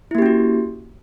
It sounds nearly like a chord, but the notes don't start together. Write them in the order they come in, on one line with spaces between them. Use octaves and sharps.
E4 A#3 G4 C#4 F#4